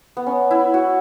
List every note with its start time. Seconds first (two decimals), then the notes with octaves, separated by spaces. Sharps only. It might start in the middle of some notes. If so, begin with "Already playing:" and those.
0.17 B3
0.27 C#4
0.51 E4
0.74 F#4